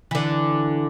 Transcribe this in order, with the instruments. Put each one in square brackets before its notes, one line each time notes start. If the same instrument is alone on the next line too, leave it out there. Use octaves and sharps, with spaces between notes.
[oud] D3 E3